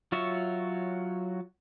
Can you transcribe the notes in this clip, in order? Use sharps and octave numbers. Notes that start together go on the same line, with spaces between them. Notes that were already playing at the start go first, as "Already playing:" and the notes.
F#3 F4 F#4 C#5 E5